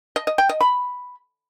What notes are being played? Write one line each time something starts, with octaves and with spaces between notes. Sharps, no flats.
D#5
D#5
G5
D#5
B5